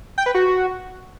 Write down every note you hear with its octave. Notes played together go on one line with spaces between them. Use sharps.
G5
B4
F#4